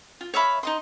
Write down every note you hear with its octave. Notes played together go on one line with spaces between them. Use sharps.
F4
C#5 E5 F5 B5
D#4 D#5 C6